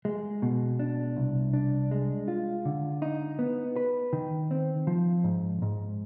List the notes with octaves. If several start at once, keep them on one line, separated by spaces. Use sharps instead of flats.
G#3
B2
D4
C2
D4
G#3
F4
D3
D#4
B3
B4
D#3
C4
F3
G#2
G#2